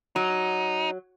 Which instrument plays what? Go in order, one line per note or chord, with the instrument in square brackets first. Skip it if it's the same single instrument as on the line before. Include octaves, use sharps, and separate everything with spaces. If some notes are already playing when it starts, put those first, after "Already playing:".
[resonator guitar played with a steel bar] F#3 [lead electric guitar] D#4